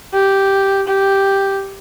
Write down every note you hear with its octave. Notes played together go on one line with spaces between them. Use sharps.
G4
G4